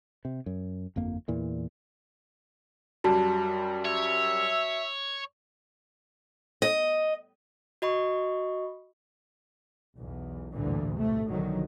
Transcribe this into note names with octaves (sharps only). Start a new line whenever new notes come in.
C3
F#2
G1 F2 A#3
E2 A#2 E3
F#2 G3 F#4 A5
C#5 E5
D#5
F#4 D#5 B5 C#6
B1 E2
A1 D2 G2 A#2 D3 E3
B1 A2 C3 A3
B1 D3 D#3 F3 F#3